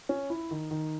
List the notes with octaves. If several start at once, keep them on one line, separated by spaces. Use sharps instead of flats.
C#4
E4
D#3
D#3